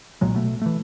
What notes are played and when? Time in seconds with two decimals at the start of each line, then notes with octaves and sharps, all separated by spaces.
0.21 B1 A#2 F#3 G#3
0.34 B2 A3
0.62 E3 A3